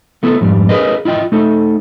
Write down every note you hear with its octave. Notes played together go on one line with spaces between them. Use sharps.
A3 B3 E4 A4
F2 G#2 G3
G#4 A#4 B4 D#5
E4 F4 D#5 G5
A3 D#4 A4